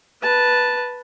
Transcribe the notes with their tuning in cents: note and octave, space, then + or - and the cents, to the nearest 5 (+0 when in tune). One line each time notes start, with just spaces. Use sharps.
B4 -5 A5 +0